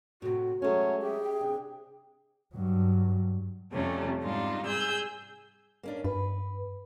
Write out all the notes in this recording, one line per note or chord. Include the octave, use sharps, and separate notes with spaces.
A2 C3 F#4
F#3 G#3 A3 C#4 A4 C#5
G4 G#4 E5
G5
C3 D4
G2 F#3
F2 C3 G3 A3 C#4
G#2 C3 G3 D4 D#4 F4
G#4 E6 G6
A#3 C#4 D4
G2 B4